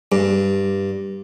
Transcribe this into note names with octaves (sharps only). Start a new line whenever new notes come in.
G2